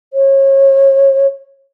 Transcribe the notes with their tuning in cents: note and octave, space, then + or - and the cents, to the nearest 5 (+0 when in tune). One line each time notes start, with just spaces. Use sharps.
C#5 -30